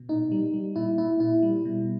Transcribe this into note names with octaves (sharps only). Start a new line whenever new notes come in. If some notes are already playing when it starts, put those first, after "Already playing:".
Already playing: B2
A#2 D#4
G3
G3
A#2 E4
A#2 E4
A#2 E4
G3
B2